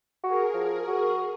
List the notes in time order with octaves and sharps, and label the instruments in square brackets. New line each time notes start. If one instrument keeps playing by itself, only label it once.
[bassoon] F#4 [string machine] G#4 A#4
[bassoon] F3
F#4